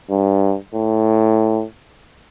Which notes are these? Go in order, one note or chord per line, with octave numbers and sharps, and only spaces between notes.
G2
A2